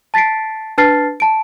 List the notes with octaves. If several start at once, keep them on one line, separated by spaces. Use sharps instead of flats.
A5 A6 B6 C7 D7
D4 B4 A5 F6 A6 C7
A5 D7